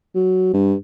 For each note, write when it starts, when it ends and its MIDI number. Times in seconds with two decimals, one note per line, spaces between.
0.15 0.51 54
0.54 0.74 43